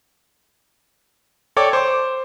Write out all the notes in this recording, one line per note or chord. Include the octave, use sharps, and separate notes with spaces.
A4 C#5 D5 G5 D6
C5 D6